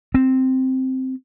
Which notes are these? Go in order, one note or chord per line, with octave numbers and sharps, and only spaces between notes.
C4